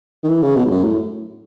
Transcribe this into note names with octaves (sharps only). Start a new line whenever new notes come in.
D#3
E3
C#3
B2
G#2
F#2
A2